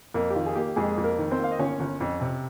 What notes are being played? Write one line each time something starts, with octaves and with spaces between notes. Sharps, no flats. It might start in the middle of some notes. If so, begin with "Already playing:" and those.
F2 A#3 A#4
G4
D#3 F4
G#4
A#3 G4
F2 G#3 G#4
F2
A#3 A#4
D#3
C4 C5
A#3 F5
D#5
G1 C#4 C#5
G1
F2
C3